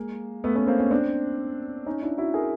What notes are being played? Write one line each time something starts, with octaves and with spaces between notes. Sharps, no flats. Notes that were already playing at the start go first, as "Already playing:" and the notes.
Already playing: G#3 A#3
A3 B3
B3 C#4
A#3 C4
B3 C#4
C4 D4
C#4 D#4
D4 E4
E4 F#4
G#4 A#4